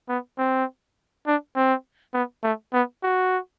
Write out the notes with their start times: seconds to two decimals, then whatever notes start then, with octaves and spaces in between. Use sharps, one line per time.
0.09 B3
0.38 C4
1.27 D4
1.56 C4
2.14 B3
2.43 A3
2.73 B3
3.03 F#4